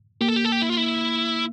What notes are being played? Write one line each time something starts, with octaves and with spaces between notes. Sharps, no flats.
A#3 G4
A4
G4
A4
G4
E4
F4
E4